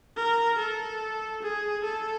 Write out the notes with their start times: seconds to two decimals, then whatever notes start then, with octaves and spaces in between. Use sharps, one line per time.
0.17 A#4
0.59 A4
1.43 G#4
1.84 A4